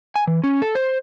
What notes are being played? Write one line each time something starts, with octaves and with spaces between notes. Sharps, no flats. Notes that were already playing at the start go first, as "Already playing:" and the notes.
G#5
E3
C#4
A4
C5